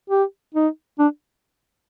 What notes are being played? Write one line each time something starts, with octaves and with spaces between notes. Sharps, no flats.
G4
D#4
D4